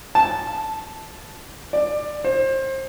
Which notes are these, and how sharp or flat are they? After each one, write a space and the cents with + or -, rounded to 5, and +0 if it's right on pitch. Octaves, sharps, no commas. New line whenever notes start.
A5 -5
D5 +15
C5 +30